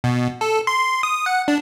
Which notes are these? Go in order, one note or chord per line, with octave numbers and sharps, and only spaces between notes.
B2
A4
C6
D#6
F#5
D4